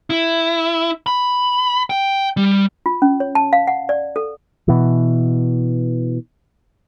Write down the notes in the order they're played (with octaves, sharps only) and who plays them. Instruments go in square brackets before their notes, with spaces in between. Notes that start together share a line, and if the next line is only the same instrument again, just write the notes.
[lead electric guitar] E4
B5
G5
G3
[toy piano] F4
C#4
C#5
A5
F5
F#5
D5
A4
[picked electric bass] B2 E3